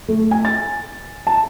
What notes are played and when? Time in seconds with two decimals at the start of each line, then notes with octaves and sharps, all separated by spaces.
0.08 A3
0.31 G#5
0.45 A6
1.27 A5